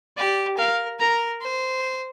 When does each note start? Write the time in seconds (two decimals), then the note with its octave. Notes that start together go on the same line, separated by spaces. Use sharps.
0.17 G4 D5
0.58 A#4 F5
1.00 A#4 A#5
1.41 C5